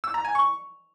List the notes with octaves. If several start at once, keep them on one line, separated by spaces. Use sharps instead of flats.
E6
A#5
G#5
C#6